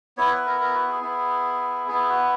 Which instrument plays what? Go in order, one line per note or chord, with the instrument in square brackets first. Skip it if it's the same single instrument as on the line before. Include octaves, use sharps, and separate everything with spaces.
[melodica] B3 E4 C#5
B4
A#4
A#4
F#4
G#4
B3 E4
B3 E4 G#4
F#4